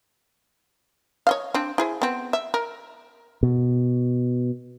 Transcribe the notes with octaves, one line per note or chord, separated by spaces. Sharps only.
C#5 D#5 F5
C4 D4
E4 G#4 C5
B3 C4
E5
A#4
B2